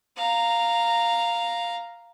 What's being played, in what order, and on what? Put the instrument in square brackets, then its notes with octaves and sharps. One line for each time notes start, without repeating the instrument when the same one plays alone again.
[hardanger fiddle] F5 A#5